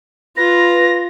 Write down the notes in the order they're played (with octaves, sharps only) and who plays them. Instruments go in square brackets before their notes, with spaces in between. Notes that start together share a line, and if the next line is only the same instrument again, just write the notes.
[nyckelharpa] F4 [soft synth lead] B4 [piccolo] A#6